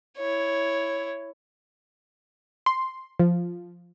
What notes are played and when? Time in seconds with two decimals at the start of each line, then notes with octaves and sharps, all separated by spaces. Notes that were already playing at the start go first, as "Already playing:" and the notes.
0.18 E4 C#5
2.66 C6
3.20 F3